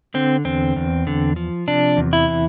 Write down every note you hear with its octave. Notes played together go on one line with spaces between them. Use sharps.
D3 C4
E2 C4
E2
D3
F3
C3 D4
E2
E4
E3